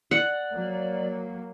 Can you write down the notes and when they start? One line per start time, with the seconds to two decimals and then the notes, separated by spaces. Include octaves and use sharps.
0.11 D5 F#5
0.51 F#3 A#3